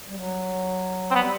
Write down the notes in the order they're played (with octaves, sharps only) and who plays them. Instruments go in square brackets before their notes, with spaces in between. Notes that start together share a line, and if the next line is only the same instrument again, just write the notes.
[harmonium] G3
F#3
[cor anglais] C4
[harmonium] G3 [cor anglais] B3